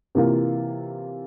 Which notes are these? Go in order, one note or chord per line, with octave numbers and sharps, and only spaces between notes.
C3 E3 A#3 F4